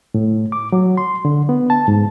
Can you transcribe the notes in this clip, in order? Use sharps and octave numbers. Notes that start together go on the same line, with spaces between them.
A2
D6
F#3
C6
D3
B3
A5
G#2